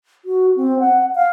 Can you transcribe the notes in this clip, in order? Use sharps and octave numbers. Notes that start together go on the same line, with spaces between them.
F#4
C4
F#5
F5